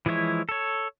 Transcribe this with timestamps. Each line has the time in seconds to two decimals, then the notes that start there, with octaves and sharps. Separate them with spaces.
0.06 E3 F3 G#3 E4 C#5
0.49 A4 C#5